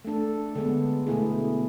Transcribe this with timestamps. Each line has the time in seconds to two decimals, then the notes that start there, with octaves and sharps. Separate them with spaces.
0.05 A3 D4 A4
0.55 D3 G#3 B3
1.07 B2 A3 E4 G#4